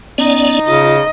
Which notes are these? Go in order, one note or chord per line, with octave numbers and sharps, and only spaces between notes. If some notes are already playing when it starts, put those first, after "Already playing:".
B3 C#4 D#4 D5
C#3 F4 D#5